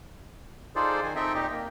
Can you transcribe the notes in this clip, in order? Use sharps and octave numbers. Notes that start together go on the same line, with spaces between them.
D#4 F4 G#4 A4 C5 D5
D#3 G#5
C4 D#4 A4 D#5 E5 G5
A#2 D#4 G4 D#5
A#3